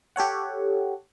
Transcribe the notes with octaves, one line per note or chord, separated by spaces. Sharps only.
G4 A4 C#5 F#5